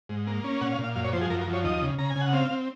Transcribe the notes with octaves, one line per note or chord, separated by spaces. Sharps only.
G#2
A#3
C#4
A#2 F#5
F5
A#2
F5
F#2 F5
C#5
F3 C5
G#4
F#2 A#4
A#4
F3
C#5
D#2 D#5
C#3
C#3 A#5
G#5
C#3
F#5
C4 F5
C4